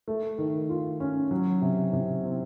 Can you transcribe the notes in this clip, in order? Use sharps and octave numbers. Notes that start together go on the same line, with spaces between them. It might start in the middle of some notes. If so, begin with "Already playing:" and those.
A3
D#3
F4
C#4
F#3
C3
C3
C4